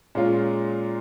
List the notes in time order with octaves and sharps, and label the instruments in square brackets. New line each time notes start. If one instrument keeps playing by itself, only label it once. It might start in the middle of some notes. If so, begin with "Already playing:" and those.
[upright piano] A#2 G#3 C#4 F4